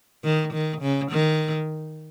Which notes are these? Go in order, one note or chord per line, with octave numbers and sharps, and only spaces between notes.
D#3
D#3
C#3
D#3